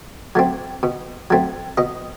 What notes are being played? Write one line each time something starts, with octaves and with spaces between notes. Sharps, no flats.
F#3 A3 C4
B2
F#3 A3 C4
B2 D#5